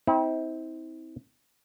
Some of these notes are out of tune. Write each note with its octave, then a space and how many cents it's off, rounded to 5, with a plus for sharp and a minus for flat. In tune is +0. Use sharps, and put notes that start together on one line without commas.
C4 +0 E4 -45